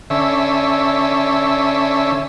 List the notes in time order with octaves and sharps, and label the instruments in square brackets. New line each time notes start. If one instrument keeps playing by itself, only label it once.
[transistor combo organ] D3 C#4 E5